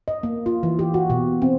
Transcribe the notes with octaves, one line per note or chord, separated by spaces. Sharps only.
D#5
A#3
F4
E3
G4
F#4
B2
C4